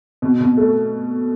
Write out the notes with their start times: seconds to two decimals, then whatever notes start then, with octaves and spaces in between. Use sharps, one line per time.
0.22 B2
0.40 B2
0.57 A3